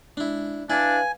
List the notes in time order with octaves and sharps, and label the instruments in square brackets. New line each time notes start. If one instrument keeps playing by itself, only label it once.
[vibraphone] G#3 [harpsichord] D4 E4
[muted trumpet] D4 [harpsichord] E4 D5 [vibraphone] B4 F5 [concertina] G#5